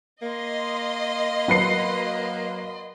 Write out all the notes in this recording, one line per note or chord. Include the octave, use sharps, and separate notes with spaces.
A#3 D#5 C6
F#3 B4 C7